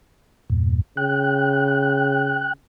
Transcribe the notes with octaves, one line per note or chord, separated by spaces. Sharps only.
E2 G2 A#2
C#3 G5 F#6